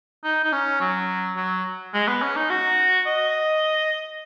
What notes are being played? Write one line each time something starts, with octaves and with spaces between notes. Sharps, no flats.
D#4
D#4
C#4
F#3
F#3
G#3
B3
C#4
D#4
F#4
D#5